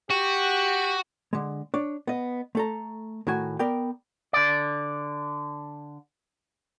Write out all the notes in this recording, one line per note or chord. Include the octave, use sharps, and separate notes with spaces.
F#4 G4
D3 G#3
D4 C#5
B3 D#5
A3 A4 A#5
A2 D#3 F#4 G#5
B3 A#4 D5 G5
D3 D5